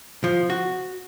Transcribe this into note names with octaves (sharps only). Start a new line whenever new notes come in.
F3
F#4